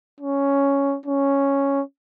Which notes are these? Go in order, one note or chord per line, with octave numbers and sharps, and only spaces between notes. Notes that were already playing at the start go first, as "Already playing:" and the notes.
C#4
C#4